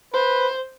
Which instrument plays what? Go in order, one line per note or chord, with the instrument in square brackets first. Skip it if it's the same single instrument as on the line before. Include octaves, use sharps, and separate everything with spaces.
[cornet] B4 [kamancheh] C5